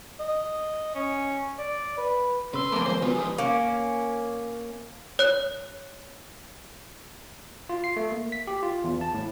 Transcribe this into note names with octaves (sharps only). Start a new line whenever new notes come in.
D#5
C#4
D5
B4
C#3 B4 C6 E6
F2 A3 A#3 G#5 A#5 D6
F3 G#3 B4 C5
C#3 F3 F#3 B3 A#4 G#5
D#3 E3 G#3 G4 B4 D#6
A#3 C#4
C#5 F#6
F4
C7
A3
A#3
B6
G4
F4
E2
A5
A2